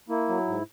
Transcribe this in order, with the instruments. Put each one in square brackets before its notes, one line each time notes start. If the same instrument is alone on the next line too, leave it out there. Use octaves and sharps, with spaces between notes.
[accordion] A#3 E4
F#3
G#2